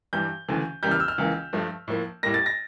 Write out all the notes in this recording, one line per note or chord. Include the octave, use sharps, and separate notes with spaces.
G2 E3 G3 G6
D2 C#3 E3 A3
E2 C#3 G3 A#3 G6
F6
E6
F6
C#2 C#3 E3 A#3
G2 F3 A3
A2 F3 A#3
A2 G3 A#3 A#6
A6
A#6